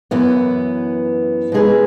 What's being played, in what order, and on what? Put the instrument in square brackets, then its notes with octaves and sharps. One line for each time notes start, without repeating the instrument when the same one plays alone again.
[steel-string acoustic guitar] F#2 E3 B3
B2 G#3 D#4 G#4 B4